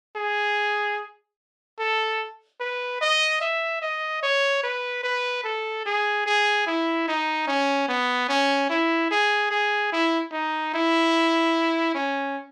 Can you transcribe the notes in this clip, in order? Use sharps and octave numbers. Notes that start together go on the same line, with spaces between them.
G#4
A4
B4
D#5
E5
D#5
C#5
B4
B4
A4
G#4
G#4
E4
D#4
C#4
B3
C#4
E4
G#4
G#4
E4
D#4
E4
C#4